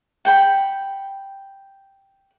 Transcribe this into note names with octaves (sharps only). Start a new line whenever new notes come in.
F#5 G5 B5